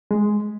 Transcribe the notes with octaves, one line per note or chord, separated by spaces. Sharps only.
G#3